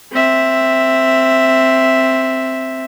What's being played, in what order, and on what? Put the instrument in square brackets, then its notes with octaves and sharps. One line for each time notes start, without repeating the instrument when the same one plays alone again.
[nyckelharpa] C4 E5